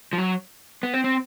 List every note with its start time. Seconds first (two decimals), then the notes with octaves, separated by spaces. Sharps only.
0.13 F3
0.18 F#3
0.83 B3
0.94 C4
1.04 C4